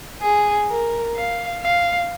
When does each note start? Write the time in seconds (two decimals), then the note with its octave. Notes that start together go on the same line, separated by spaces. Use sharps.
0.21 G#4
0.69 A#4
1.15 F5
1.62 F5